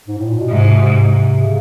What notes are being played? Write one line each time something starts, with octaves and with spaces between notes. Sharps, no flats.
G#2
A2
A#2
B2
G#2 C3
C#3